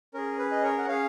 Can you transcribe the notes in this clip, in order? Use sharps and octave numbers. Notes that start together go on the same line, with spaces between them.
C#4 G#4 A#4
B4
D#5
A#4 C#5
F#5
C#4 G#4 C#5 F5